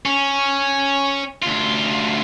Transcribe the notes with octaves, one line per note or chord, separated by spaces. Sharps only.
C#4
D2 F4